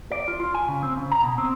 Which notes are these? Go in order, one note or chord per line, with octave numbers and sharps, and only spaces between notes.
D5
F4
F4
G#5
C#3
C4
C#3
A#5
B2
C4